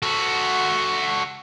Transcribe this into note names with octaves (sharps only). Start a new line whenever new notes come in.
F#4 A4